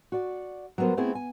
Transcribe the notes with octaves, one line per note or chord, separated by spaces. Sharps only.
F#4 D5
F#3 G3 B3 A#4 C5
A3 B3 C4 E4 G#4
G#5